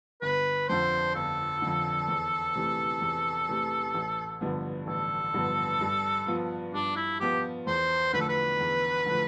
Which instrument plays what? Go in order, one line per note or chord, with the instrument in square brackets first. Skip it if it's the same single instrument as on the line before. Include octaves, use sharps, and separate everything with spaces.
[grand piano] G1 [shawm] B4
[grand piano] F2 D3 [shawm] C5
[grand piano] G1 [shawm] A4
[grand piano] F2 D3
E2
C3 E3 A3
E2
C3 E3 A3
A1
G2 D3 F3 B3
[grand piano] A1 [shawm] A4
[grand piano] G2 D3 F3 B3
G2
F3 B3 F4
[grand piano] G2 [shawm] D4
[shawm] E4
[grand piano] F3 B3 F4 [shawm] G4
[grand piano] E2 [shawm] C5
[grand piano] D3 F3 A3 [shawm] B4
[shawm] A4
B4
[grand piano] E2
D3 F3 A3